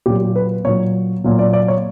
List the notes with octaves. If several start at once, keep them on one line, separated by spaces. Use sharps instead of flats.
A#2 F#3 G4
B4
A#2 F#3 C#5
A#2 F#3
D5
D5
C#5